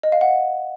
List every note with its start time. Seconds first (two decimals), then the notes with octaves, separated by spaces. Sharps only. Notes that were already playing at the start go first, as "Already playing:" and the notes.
0.03 D#5
0.12 F5
0.21 F#5